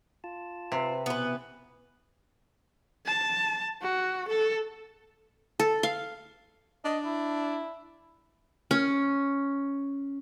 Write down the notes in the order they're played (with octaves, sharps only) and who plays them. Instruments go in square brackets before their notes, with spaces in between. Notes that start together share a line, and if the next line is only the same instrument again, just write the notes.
[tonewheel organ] F4 A5
[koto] C3 [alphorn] B4
[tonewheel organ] B2 [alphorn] E3 [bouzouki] B3 B4
[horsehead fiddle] A5
F#4
A4
[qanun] A4
F5
[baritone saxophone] D4 [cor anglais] D#5
[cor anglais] E4
[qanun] C#4